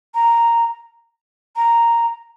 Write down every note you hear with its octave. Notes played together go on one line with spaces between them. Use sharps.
A#5
A#5